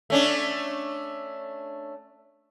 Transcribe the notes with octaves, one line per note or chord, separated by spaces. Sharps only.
A3 C#4 D4